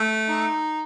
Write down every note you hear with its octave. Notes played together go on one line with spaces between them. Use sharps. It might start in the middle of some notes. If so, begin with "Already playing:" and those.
Already playing: A3
D#4